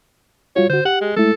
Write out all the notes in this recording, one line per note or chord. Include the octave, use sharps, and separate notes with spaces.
G3 F4 F#4 C#5
D3 F#4 C5
G4 F#5
G#3
G#3 A3 E4 A4